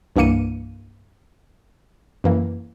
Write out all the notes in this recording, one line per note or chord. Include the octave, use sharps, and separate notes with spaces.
C2 G2 E3 A#3 C#7 D#7
F#2 E3 A#3